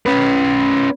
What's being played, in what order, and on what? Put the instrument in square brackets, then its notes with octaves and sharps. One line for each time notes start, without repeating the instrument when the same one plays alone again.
[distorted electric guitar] C#4 B4